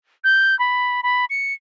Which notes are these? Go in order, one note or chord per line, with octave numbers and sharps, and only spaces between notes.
G6
B5
B5
C#7